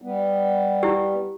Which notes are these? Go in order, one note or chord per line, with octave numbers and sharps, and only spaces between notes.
G3 B3
E4 G4